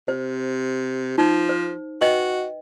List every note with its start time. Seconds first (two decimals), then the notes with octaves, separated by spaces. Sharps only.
0.08 C3 C5
1.18 F3 D#4
1.49 C5
2.01 F#4 B4 D#5 G5